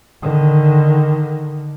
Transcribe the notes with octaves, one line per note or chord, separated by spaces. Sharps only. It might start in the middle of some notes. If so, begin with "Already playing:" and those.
D3 D#3